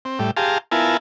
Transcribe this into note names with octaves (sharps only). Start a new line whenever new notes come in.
C4
A2 G3
G4 G#4 F5 A5 A#5 C6
B3 E4 F4 A#4 G#5 A5